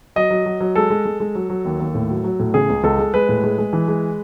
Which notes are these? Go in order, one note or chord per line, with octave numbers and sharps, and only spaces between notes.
F#3 D#5
F#3
F#3
F#3
G#3 A4
G#3
G#3
G#3
F#3
F#3
D#2
D#2
A2
F#3
F#3
A2
C#3 G#4
C#2
C#2 A4
G#3
G#3 B4
A2
G#3
G#3
E3
G#3